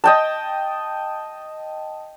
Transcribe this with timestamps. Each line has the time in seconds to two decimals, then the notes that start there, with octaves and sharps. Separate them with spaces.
0.04 D#5 G5 A5